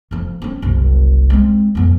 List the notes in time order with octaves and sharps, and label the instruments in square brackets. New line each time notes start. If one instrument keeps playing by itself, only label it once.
[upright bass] F1 F2
C4 C#4
F#1 C2
G#3 C4
F2 B3